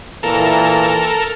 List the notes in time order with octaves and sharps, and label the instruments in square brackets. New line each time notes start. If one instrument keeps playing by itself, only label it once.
[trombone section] A#2 E3 [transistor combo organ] A4 A#4